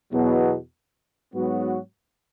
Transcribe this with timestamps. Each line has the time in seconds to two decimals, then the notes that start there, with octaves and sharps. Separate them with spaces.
0.12 E2 B2 F#3 B3
1.34 G#2 F#3 B3 F#4